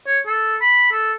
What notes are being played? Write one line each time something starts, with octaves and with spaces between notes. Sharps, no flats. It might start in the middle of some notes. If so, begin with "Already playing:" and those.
C#5
A4
B5
A4